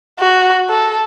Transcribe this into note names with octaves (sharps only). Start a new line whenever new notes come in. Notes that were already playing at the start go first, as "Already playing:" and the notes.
F#4
A4